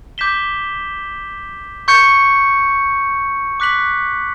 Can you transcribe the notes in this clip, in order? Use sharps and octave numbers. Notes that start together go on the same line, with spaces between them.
D6 G6 B6 E7 G7
C#6 G6 C#7
D6 F#6 B6 F#7